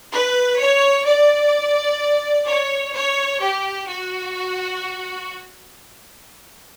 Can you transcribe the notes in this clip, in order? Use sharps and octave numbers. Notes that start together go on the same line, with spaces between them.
B4
C#5
D5
C#5
C#5
G4
F#4